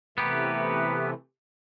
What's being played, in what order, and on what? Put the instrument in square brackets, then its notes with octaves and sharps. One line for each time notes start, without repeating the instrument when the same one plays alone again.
[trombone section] E2 A#4 B4 [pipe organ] C3 E3 A3 [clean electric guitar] B3 G4